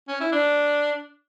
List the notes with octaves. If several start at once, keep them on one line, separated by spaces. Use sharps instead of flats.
C#4
E4
D4